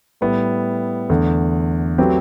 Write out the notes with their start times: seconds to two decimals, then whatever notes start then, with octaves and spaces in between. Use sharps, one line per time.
0.21 A2 G3 B3 E4
1.10 E2 D3 A3
1.98 F#3 A3 C4 G4 B4